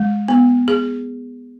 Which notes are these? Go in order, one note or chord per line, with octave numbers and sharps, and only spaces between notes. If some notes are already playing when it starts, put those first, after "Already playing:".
Already playing: G#3
B3
G#4